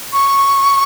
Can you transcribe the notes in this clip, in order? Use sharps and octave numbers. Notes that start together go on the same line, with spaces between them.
C#6